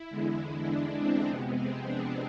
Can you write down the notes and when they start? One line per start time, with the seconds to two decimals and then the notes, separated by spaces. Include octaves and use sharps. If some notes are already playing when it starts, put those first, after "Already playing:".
Already playing: E4
0.10 E2 D3 G#3
0.69 D4
0.98 C4
1.27 F2 C3 G#3 B3
1.56 C4
1.86 D4